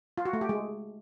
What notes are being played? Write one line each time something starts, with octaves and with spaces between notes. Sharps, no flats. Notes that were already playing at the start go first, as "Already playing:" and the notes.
F4
F#4
A3
G4
G#3